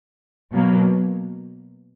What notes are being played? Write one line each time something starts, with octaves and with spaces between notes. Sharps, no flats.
B2 F#3 A#3